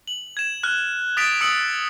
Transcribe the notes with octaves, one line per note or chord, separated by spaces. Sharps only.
F#7
G#6 E7
F6 F#6
D#6 A6 B6 D7 F7
D#6 E6 C#7 F#7